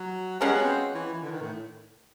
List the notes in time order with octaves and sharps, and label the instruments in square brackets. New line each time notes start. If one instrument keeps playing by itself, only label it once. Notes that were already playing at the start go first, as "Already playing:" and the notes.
Already playing: [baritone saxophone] F#3
[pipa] F3 G#3 C#4 F#4 [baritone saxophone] G3
[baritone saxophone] B3
C4
E3
E3
D3
D#3
A2